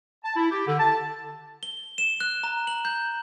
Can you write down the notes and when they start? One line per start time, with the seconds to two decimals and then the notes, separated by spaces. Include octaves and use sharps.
0.24 A5
0.36 E4
0.51 G4
0.67 D3
0.80 A5
1.63 G7
1.98 E7
2.20 F#6
2.43 A#5
2.67 F#7
2.85 G6